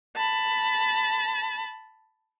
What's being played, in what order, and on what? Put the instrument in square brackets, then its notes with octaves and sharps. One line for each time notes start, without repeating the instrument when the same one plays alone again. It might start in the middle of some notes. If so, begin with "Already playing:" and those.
[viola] A5 B5